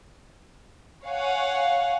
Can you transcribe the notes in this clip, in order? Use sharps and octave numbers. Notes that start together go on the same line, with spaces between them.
C#5 F5 F#5 G#5